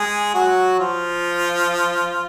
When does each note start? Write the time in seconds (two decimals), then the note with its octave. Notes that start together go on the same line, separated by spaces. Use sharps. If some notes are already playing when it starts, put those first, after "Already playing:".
Already playing: G#3 G#4
0.35 F#3 F#4
0.80 F3 F4